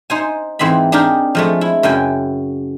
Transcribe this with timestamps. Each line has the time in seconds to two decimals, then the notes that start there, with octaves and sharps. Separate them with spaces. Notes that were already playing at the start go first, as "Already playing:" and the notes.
0.10 D#4 C5 G#5
0.59 G#2 E3 C4 D#5 B5
0.92 D4 D#4 G4 G#4 A#4
1.35 F3 G#3 A3
1.61 E4
1.83 F#2 C#3 E4 G5 G#5